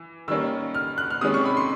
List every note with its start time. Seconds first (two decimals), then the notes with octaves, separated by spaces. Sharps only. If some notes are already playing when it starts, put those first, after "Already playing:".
Already playing: E3
0.28 D#3 G3 A#3 C#4 E6
0.75 F6
0.98 F#6
1.10 F6
1.21 C3 D#3 G#3 C#4 D#6
1.34 C#6
1.45 B5
1.57 C6